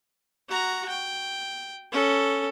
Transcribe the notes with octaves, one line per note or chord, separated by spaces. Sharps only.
F#4 A#5
G5
C#4 A4